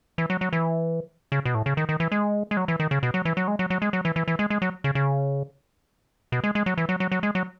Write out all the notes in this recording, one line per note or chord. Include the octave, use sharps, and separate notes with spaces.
E3
F#3
F#3
E3
C#3
B2
A2
C#3
D#3
D#3
E3
G#3
G#3
F#3
E3
D#3
C#3
B2
F#3
E3
F#3
G#3
F#3
F#3
G#3
F#3
E3
E3
E3
G#3
G#3
F#3
C#3
C#3
B2
G#3
G#3
F#3
E3
F#3
F#3
F#3
G#3
F#3